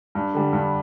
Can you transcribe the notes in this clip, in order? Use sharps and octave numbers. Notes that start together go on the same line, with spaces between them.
G2
D3 G3
G2